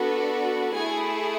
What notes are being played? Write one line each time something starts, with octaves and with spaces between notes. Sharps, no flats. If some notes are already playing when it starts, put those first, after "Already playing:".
Already playing: B3 D4 F#4 A4
A3 E4 G#4 G#5